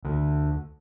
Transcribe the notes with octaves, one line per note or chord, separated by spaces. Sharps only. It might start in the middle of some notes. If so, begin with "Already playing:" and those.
D2 D3